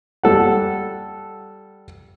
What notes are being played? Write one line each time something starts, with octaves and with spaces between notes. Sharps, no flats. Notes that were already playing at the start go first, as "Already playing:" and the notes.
G3 A4 F#5